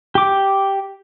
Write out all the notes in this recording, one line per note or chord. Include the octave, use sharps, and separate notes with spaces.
G4 D6